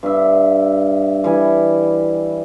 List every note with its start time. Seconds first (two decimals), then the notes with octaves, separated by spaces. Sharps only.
0.03 G2 E5
1.24 E3 G3 G#5